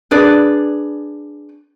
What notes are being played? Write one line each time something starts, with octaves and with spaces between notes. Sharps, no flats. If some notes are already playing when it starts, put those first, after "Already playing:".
D4 G#4 B4 D5